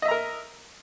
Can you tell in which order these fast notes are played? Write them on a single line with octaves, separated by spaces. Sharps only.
D#5 E5 A#5 A#4